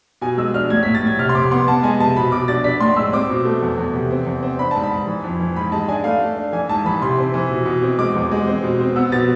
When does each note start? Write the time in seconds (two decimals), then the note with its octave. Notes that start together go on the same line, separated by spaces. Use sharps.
0.21 B2 G#5
0.37 G#3 E6
0.54 D4 F6
0.70 A2 G#6
0.83 A2 B6
0.95 A6
1.03 A2 G#6
1.19 C3 F6
1.29 C6
1.35 C3 D6
1.51 B3 C6
1.67 B3 A5
1.83 G#3 G#5
2.00 C3 A5
2.16 B2 B5
2.32 B2 D6
2.48 D4 A6
2.64 D4 B6
2.80 A2 C6
2.97 G#3 E6
3.13 C4 D6
3.29 B2
3.45 A3
3.62 E2
3.78 E2
3.94 C3
4.11 C4
4.26 E2
4.43 C4
4.59 D4 B5
4.71 G#2 A5
4.83 B5
4.91 G#2
5.07 E3
5.24 F2
5.40 E3
5.56 G#2 B5
5.72 G#3 A5
5.88 D4 G#5
6.04 A3 F5
6.20 A3
6.36 D4
6.53 E3 G#5
6.69 G#2 A5
6.85 E3 B5
7.01 C3 C6
7.18 C4
7.34 E3
7.51 B2
7.66 B2
7.82 C4
7.98 G#3 D6
8.15 E2
8.31 G#3
8.47 C4
8.63 B2
8.80 C4
8.96 B3 E6
9.12 B2 A6